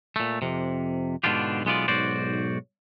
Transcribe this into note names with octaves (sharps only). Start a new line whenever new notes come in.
A#2 A3
F2 C3
G#2 B2 D3 D4 F4 G4
B1 G#3 B3 F4 D5
B1 G#2 F#4 C5 D5